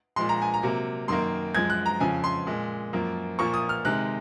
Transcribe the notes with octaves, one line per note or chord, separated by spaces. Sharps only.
A#2 F3 G#3 C6
A#5
G#5
A#5
C3 F#3 A#3
F#2 D#3 A#3 C6
F#2 F3 G#3 G#6
F#6
A#5
F2 C#3 F3 G#5
C6
A#2 G#3
F#2 F3 A#3
A#2 F3 A#3 C#6
D#6
F6
C3 D#3 G#3 F#6